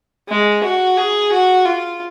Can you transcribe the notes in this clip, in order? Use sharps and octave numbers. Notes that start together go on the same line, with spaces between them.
G#3
F#4
G#4
F#4
F4